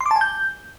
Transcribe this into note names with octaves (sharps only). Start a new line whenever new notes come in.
C6
D6
A5
G#5
G6